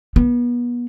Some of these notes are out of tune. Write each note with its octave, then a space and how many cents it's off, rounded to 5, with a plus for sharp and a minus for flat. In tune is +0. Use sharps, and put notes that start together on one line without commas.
B3 -30